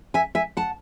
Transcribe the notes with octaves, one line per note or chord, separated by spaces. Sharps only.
E5 G#5
E5 G#5
F#5 A5